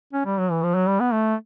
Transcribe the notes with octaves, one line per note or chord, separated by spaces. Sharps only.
C#4
G3
F#3
E3
F3
F#3
G3
B3
A3